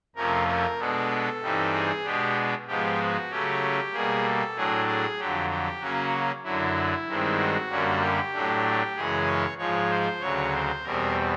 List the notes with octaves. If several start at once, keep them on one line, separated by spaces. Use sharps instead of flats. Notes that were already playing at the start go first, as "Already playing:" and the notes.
F2 C3 F3 A3 C#4 A#4
A#4
B2 G#3 B3 D4 A4
G2 E3 G3 C4 D#4
G#4
B2 G#3 B3 D4 G4
G#2 F3 G#3 B3 G4
F#4
C#3 F#3 A3 C#4 G4
B2 G3 A#3 G#4
A4
A2 F#3 A3 D4 G#4
G#4
F2 D3 F#3 G4
G4
C#3 F#3 A#3 C#4 F#4
F#2 D3 F#3 E4
G2 D#3 G#3 C4
F#4
F#2 D3 G3 A#3 C#4
G4
A2 F#3 A3 D4
F#2 C#3 E3 G#3 C#4 G#4
C#5
G#2 F3 G#3 C#5
C5
D2 C#3 F#3 C#5
C5
E2 B2 G3 C4 A#4